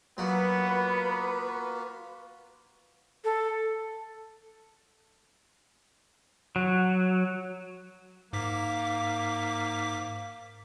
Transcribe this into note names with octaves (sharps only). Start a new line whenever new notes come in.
F#3 A#3 B3 F4 F#4 B4
A4
F#3
G#2 A#3 D6 B6